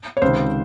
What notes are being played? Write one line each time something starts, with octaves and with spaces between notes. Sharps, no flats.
C#5
C#2 C3 D#3 C5